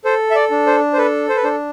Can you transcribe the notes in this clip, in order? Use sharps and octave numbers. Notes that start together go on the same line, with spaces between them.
A4 C5
E5
D5
D4
C5
C5
A4 B4
C5
B4
D4 C5